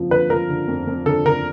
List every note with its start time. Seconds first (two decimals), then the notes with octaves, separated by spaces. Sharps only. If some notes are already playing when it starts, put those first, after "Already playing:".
Already playing: F#1 F2 F3
0.10 D3 B4
0.30 F3 A#4
0.49 D3
0.68 F2
0.87 F2
1.06 D3 A4
1.25 D3 A#4